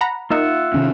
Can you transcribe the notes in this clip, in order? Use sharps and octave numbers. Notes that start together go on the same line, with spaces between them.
F#5 A#5 B5
A#3 D#4 F4 E5 F#5
C3 D#3 C#4